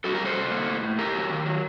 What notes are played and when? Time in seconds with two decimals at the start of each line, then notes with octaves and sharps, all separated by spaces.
0.04 G3 F#4 A4
0.15 G4 A#4
0.20 G3
0.25 A4 C5
0.36 C3
0.51 A#3
0.67 A2
0.83 A2
0.98 A#3 G4 A#4
1.14 F#3
1.30 D#3
1.46 F#3